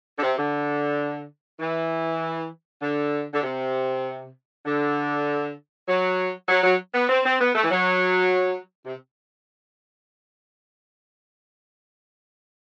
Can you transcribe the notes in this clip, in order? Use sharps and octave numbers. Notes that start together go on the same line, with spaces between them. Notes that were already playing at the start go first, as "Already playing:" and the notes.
D3
C3
D3
E3
D3
D3
C3
D3
F#3
F#3
F#3
B3
C4
C4
B3
A3
E3
F#3
C3